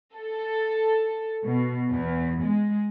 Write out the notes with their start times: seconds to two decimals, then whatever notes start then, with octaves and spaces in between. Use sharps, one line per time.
0.16 A4
1.44 B2
1.90 E2
2.42 G#3